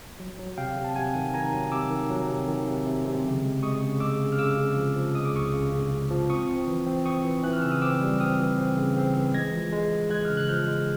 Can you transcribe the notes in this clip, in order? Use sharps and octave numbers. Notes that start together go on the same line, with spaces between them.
F#3
F#3
C3 F5 G5
C3
A5
C3 F#5 G#5
D#3
D#3 G#5 A#5
F#3
C3 D6 E6
D#3
F#3
C3
D#3
C3
C3
C3
C#3
G#3
G#3 C#6 D#6
C#3
G#3 D6 E6
C#3
F6
C#3 D6 E6
C#3
F3
F3
G#3 D#6
D6
C#2 C#6 D#6
C#3
C#3
C#3
F3
C4 C#6 D#6
C4
E3
C4
C4 C#6 D#6
E3
E3 F#6
F6
C#3 E6
D#6 F6
C4 D6 E6
G3
C4 D#6 F6
E3
C4
C#3
C4
E3
G#3 G#6 A#6
F3
G#3
G#3
G#3 F#6 G#6
C#3 F6
F#6
F3 F6 G6
G#3